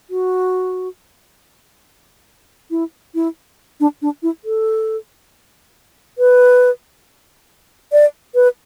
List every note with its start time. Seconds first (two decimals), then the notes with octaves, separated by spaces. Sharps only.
0.10 F#4
2.71 E4
3.15 E4
3.80 D4
4.02 D4
4.23 E4
4.45 A4
6.18 B4
7.92 D5
8.35 B4